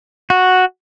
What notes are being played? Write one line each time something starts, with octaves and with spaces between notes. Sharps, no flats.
F#4